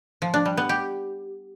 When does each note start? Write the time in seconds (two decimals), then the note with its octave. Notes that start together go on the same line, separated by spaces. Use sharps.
0.22 F3
0.34 D4
0.46 G3
0.57 B3
0.69 G4